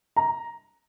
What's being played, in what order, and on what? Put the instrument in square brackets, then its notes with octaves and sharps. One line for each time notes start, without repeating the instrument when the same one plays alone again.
[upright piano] A#5